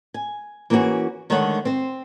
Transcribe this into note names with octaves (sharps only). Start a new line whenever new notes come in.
G#5
E3 A#3 B3 C#4 F#4 G#4
D3 D#3 G#3 A3 C#5 F#5
C4 C5